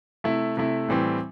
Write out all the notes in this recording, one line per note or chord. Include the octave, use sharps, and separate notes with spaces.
C3 A3 E4
C3 A3 E4
A2 E3 G3 C4